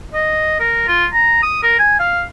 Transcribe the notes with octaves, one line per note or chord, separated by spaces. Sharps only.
D#5
A#4
F4
A#5
D#6
A#4
G#5
F5